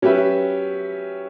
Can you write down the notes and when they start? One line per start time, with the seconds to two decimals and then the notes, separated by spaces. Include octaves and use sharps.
0.02 F#3 C#4 G4 B4 E5